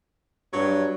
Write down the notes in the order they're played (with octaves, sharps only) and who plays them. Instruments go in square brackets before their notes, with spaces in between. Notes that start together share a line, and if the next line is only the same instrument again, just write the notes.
[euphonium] G2 [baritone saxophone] F#3